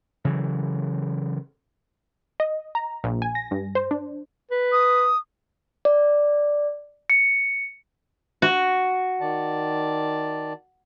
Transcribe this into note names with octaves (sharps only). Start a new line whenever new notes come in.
C#3 E3 F#3
D#5
A#5
A#1
G#5
A#6
G2
C5
D4
B4
D#6
D5
C#7
F#4
D#3 D5 A5